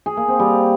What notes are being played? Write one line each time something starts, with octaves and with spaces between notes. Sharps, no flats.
G#4
A#3
C4
G3